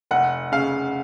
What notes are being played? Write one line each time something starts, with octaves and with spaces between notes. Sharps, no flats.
F1 F#5
C#3 F5